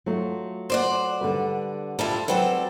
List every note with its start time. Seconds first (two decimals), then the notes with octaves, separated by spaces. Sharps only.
0.06 F#3 A3 F4
0.70 C5 D5 F#5
1.21 D3 G3 B4
1.99 G3 D4 E4 F4 A5
2.28 F#3 G3 C4 A4 B4 F#5